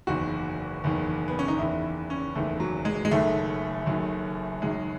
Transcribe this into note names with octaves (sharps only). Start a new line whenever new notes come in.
F#1 E2 D#3 F#4
F#1 E2 D#3
B3
C#4
D#4
F#1 E2 D#3 E4
C#4
F#1 E2 D#3 A3
F#3
G#3
G#3
F#1 F#2 D#3 A3
F#1 F#2 D#3
F#1 F#2 D#3 G#3